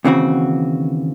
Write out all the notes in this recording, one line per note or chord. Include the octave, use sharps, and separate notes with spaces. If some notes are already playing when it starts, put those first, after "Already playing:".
D#2 C#3 E3 C4 F#4